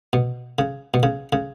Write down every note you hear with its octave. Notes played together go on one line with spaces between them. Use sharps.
B2
C#3
B2
C#3
C#3